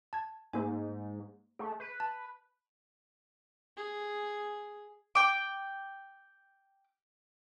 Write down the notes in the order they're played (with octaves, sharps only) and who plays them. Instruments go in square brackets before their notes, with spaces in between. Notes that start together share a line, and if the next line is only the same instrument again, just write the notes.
[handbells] A5 G#6
[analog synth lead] G#2 [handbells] A3 A#3 G#5
[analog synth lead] A3 [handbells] G#4
[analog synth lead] B4
[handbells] A5
[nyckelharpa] G#4
[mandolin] G5 D6